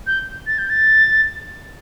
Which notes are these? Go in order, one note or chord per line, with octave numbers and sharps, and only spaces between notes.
G6
A6
G6
A6